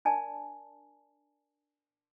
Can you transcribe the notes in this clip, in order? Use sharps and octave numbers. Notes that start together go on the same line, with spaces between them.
D4 A#4 D5 G#5 A5